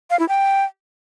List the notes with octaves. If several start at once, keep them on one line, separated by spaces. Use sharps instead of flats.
F5
E4
G5